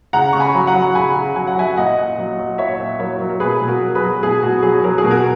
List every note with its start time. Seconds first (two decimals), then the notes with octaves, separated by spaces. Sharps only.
0.13 C#3 F#5 A#5
0.33 C#3 C#6
0.40 G#5 B5
0.54 F#3
0.67 F#5 A#5
0.75 F#3
0.95 C#3 G#5 B5
1.16 C#3
1.36 F#3 G#5
1.47 F#5
1.57 F#3 E5 G#5
1.77 A#2 D#5 F#5
1.97 A#2
2.19 F#3
2.39 F#3
2.58 A#2 C#5 E5
2.79 A#2
2.99 F#3 A#4 C#5
3.20 F#3
3.29 A#4
3.40 B2 G#4 B4
3.62 B2
3.68 F#4 A#4
3.82 F#3
3.95 G#4 B4
4.03 F#3
4.23 B2 G#4
4.43 B2 F#4
4.63 F#3 G#4
4.84 F#3 A#4
4.98 G#4
5.04 B2
5.11 F#4 A#4